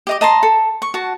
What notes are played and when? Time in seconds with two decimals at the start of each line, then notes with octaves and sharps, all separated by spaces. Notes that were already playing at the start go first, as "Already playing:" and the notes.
0.07 G4 D#5 D6
0.21 D#5 A5 A#5 C6
0.43 A4
0.82 C#6
0.94 F#4 A5